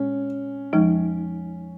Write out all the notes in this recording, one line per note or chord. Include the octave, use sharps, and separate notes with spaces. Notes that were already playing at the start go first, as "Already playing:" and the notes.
Already playing: A#2 G#3 C#4
F2 F3 G#3 D#4